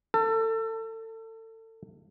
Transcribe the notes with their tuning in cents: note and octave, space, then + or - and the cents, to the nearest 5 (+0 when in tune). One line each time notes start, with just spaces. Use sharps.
A4 +30